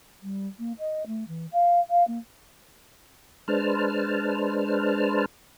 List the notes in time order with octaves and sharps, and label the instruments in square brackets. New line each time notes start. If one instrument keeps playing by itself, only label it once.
[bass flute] G3
A#3
D#5
A3
E3
F5
F5
A#3
[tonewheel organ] G#3 D4 B4 C5 A5 F6